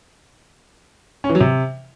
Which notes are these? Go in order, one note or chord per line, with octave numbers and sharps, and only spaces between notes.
C#4
E3
F#3
C3